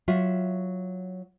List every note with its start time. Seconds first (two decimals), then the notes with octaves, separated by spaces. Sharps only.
0.08 F#3 F4 E5